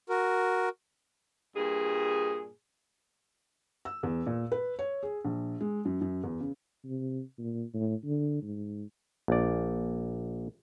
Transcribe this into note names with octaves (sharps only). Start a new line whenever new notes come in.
F#4 A#4
G2 A#2 G#4
E6
E2
A#2
B4
C#5
G#4
A#1
G#3
F#2
F#2
E2
C#3
C3
A#2
A2
D3
G#2
A#1 D5